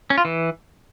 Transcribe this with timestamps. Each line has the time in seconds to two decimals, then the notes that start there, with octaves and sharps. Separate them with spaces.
0.10 C#4
0.18 F4
0.25 E3